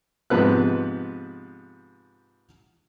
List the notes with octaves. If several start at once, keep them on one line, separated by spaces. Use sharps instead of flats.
G#2 C3 F3 B3 B4 F#6